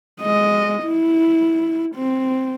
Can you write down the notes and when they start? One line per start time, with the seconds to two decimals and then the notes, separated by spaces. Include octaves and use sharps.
0.21 G#3 D#5
0.84 E4
1.95 C4